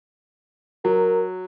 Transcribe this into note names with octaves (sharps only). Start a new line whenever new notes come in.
F#3 A#4